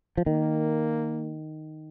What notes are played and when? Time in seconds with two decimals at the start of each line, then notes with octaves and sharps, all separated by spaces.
0.17 F3
0.26 D#3 A#3